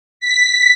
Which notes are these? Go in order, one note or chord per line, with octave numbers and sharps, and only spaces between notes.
B6